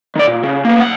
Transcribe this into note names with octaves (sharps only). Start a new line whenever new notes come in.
D#3 D5
A#2
C#3
A#3 B3
B1 F#5